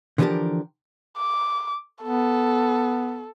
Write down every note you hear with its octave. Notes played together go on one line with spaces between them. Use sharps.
D3 E3 F3 D4 G4 A#4
D6
B3 A4